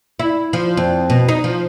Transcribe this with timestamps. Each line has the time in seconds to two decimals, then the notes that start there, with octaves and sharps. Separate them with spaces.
0.19 E4
0.53 F3
0.77 F2
1.10 B2
1.29 D#4
1.44 F3